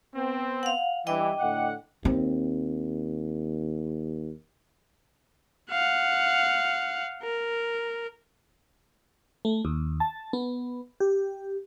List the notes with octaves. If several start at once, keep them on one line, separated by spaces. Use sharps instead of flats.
B3 C4
F5 F#5
G2 E3 D#5 G5 D6
A2 D3 F#5
D#2 C4
F5 F#5
A#4
A3
D#2
A5
B3
G4